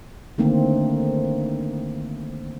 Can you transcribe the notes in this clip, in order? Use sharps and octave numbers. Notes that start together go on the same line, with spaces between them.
D3 D#3 A3 A#3 C4